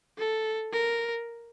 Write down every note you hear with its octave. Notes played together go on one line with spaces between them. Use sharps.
A4
A#4